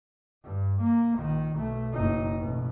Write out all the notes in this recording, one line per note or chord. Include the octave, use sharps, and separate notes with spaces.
G2
A#3
A#1 D#3
B1 A3
F#1 D#4
A1 B2